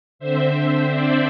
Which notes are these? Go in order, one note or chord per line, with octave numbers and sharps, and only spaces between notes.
D3 C4 C5 E5
D5